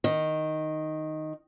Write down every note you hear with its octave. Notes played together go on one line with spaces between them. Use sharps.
D#3